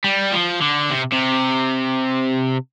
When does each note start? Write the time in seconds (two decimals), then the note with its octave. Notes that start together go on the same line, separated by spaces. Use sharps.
0.04 G3
0.32 F3
0.61 D3
0.90 C3
1.13 C3